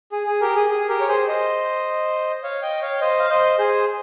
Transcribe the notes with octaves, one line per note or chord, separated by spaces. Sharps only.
G#4
G#4
G4 A#4
G#4
G#4
G4 A#4
C#5
G#4 C5
C5 D#5
C#5 F5
D#5 G5
C#5 F5
C5 D#5
F5
C5 D#5
G#4 C5